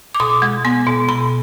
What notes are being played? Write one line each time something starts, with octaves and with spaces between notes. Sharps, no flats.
D6
B2 D#6
G#3
B3 C6
B2
B2 B5